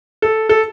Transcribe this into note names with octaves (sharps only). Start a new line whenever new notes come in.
A4
A4